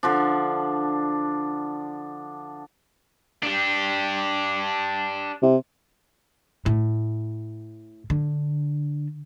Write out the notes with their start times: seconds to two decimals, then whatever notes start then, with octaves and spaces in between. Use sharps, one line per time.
0.03 D3 F3 D4
3.43 D4 G4
5.42 C3
6.66 A2
8.10 D3